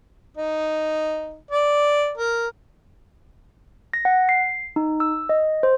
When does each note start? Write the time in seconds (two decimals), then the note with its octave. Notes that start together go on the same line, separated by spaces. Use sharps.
0.37 D#4
1.51 D5
2.18 A#4
3.94 A#6
4.05 F#5
4.29 C7
4.76 D#4
5.00 E6
5.29 D#5
5.63 C5